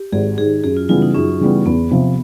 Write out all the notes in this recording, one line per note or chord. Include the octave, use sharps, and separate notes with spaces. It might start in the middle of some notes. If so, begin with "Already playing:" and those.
Already playing: G4
G#1 G#4
G#2 D#3 G#4
F#2 G#4
F4
C#3 E3 G3 B3 F4
D#4
F#2 C#4
C#3 E3 G3 B3
E2 B3
C3 F3